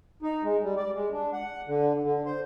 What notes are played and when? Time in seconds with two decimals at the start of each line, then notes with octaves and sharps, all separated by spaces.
0.22 D#4
0.43 G#3
0.62 G3
0.77 D5
0.95 G#3
1.13 D4
1.33 F#5
1.68 D3
2.03 D3
2.26 C5